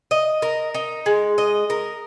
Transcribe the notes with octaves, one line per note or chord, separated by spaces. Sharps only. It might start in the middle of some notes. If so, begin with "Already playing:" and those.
D#5
A#4
D#4
G#3
D#5
A#4